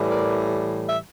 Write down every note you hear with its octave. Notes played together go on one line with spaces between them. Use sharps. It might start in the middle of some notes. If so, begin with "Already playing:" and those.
Already playing: A2 E3 G3
A#4 D5
E5